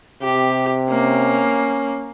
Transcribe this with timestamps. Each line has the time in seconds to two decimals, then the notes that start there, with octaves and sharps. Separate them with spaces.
0.23 C3 G4
0.90 A#3 C#4